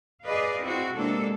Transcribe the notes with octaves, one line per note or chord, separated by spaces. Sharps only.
G#4 B4 D5 D#5 F5
C4 E4 F#4
C3 G#3 A#3 D4 A4